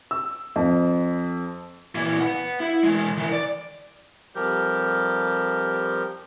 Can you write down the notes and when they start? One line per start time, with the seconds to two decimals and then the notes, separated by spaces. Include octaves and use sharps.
0.11 E6
0.56 F2
1.95 A#2 E3
2.21 B4 F#5
2.60 E4
2.83 E3 G#3
3.17 D#3 E3
3.32 D5
4.35 F2 F3 G3 G4 A#4 G6